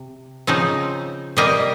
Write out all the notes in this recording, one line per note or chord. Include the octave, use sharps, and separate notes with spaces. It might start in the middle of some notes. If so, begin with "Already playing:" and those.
Already playing: C3
C#3 F3 C4 D#4
C3 G3 A#3 D#5